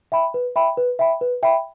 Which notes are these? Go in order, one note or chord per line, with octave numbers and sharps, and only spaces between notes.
E5 G5 B5
B4
E5 G5 B5
B4
E5 G5 B5
B4
E5 G5 B5